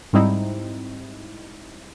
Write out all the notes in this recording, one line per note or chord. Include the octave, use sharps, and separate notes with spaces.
G#2 G3 C4 D#4 E4